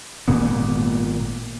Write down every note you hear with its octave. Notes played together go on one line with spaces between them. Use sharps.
G#1 A#2 A#3 B3